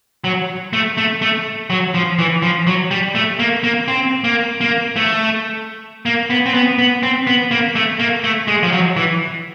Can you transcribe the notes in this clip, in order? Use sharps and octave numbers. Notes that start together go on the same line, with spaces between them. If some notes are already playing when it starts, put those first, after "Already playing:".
F#3
A3
A3
A3
F#3
F3
E3
F3
F#3
G3
A3
A#3
A#3
C4
A#3
A#3
A3
A#3
B3
C4
B3
B3
C4
B3
A#3
A3
A#3
A3
G#3
F3
F#3
E3